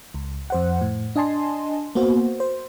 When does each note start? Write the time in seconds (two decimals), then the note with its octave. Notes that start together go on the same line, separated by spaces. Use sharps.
0.14 C#2
0.50 F2 C5 F#5
0.81 A2
1.16 D4 D#5 G#5 A5 C6
1.95 A#3 B3 F#4 C5
2.40 C5